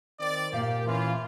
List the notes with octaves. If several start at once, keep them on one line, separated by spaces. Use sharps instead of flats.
D#3 C4 D5
A#2 A#3 G4 F5
E3 C#4 F4